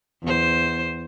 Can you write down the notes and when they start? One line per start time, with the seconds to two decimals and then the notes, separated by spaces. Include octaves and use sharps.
0.23 E2 C5